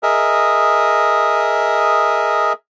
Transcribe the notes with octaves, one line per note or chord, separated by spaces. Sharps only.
G#4 A#4 D#5 E5